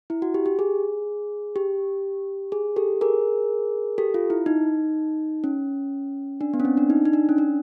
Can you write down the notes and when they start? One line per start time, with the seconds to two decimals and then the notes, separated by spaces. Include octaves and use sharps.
0.10 E4
0.22 F#4
0.34 G4
0.46 G4
0.59 G#4
1.56 G4
2.52 G#4
2.76 G4 A4
3.01 G#4 A#4
3.98 G4 A4
4.14 F4
4.30 E4
4.46 D#4
5.44 C#4
6.41 D4
6.54 B3
6.60 C#4
6.65 C4
6.77 D4
6.90 D#4
7.05 D#4
7.13 D4
7.29 C#4
7.38 D4